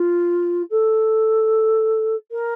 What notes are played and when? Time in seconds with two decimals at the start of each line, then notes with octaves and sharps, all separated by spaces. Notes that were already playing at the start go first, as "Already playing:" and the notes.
Already playing: F4
0.70 A4
2.31 A#4